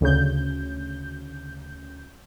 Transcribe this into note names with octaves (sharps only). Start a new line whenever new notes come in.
D2 C#3 G6